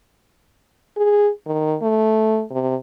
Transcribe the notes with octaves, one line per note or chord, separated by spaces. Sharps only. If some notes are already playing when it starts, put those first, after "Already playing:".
G#4
D#3
A3
C3